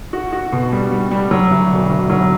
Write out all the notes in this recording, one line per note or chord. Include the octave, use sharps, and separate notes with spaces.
F#4
F#4
B2
G3
G3
G3
F#3
D2
E1
D2
F#3